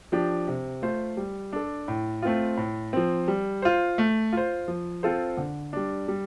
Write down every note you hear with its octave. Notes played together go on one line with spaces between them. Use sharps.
F3 D4 G4
C3
A3 F4 C5
G3
D4 A4
A2
A3 C4 F4
A2
F3 C4
G3
F4 C5
A3
F4 C5
F3
C4 F4 A4 C5
D3
G3 D4
G3